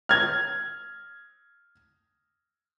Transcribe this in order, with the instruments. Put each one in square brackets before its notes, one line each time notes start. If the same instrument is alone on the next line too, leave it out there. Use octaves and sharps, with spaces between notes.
[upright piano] F6 G#6